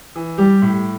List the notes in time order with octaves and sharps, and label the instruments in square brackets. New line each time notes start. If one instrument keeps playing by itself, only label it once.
[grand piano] E3
[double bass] G3 [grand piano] G4
[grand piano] A2